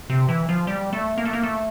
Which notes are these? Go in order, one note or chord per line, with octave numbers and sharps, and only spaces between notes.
C3
E3
F3
G3
A3
A#3
A3
A#3
A3